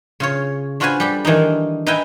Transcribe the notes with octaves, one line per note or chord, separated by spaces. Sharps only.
C#3 F4 C#5
D4 F4 F#4 B4 C5 G#5
G3 G4 A4
D#3 E3 D4 D#4
D#4 B4 D#5 E5 G5 G#5